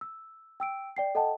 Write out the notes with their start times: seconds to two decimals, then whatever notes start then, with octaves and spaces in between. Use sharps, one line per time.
0.01 E6
0.60 G5 E6 D7
0.96 D5 G5 C7
1.15 A4 D#5 F#5 G5 A5